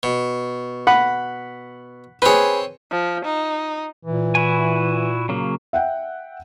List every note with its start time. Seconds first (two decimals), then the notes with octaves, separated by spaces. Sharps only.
0.03 B2
0.87 F#5 B5
2.22 C4 G#4 B4 C#5
2.91 F3
3.25 D#4
4.04 A#2 E3
4.35 E4 F#4 G#5
5.29 C#3 F#3 A#3
5.73 E5 F#5 G5